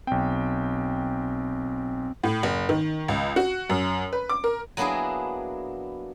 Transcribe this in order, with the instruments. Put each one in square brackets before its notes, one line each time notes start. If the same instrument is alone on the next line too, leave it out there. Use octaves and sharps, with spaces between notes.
[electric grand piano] B1 G5 [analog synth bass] C4
[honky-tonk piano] A2
F#1
D#3
C#2
F#4
F#2
B4
D6
A#4
[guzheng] F#3 A#3 B3 D4 E4 G#4